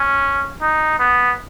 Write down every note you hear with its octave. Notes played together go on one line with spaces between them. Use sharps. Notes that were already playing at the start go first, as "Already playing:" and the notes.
Already playing: C#4
D#4
B3